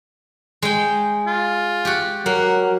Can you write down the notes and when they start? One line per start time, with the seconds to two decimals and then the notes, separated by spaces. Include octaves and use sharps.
0.62 G#3 G5
1.27 F4
1.85 F#4 G4
2.26 F#3 A#3 F#5